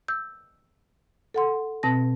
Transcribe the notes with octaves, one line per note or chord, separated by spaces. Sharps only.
E6 G6
A4 F#5 C6
B2 C4 A5 A#6